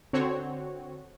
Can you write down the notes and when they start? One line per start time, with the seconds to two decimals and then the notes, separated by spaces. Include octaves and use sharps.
0.13 D3 C4 F#4 C#5